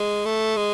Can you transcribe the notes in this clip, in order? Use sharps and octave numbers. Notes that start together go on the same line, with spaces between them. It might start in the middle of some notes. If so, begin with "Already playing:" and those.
Already playing: G#3
A3
G#3